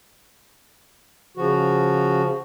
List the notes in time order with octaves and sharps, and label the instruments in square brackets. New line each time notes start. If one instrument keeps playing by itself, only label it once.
[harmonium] C#3 F3 F#4